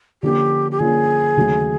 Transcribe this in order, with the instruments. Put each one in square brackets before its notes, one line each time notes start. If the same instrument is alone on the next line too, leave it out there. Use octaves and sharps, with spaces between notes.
[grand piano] D3 F3 A#3 C#4 F4 [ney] G4
[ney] G4
[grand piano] D3 F3 A#3 C#4 F4 [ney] G#4
[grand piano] D#2 C#3 F#3 A3